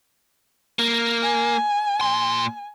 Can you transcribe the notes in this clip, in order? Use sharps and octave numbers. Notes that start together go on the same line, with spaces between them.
A#3
G#5
A#2 C6